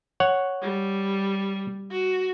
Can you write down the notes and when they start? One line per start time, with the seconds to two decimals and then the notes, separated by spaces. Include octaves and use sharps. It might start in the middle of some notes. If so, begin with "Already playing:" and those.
0.20 C#5 F#5
0.62 G3
1.91 F#4